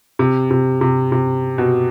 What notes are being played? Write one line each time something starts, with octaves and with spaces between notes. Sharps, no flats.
C3
C3
C3
C3
B2